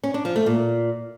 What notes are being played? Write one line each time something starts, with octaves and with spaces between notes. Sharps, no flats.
C#4
D4
F3
A3
A#2